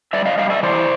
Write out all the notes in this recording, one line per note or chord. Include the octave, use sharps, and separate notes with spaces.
G3 D5 E5
D#5 F5
G3 D#5 F5
D5 E5
E3 C5 D5